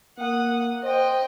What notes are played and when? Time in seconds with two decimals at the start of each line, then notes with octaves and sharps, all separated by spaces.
0.18 A#3 F#5 D#6
0.83 C5 D#5 G5